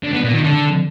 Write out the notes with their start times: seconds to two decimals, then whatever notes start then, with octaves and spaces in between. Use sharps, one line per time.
0.03 D3
0.13 B3
0.23 A#2
0.33 D#3
0.44 D3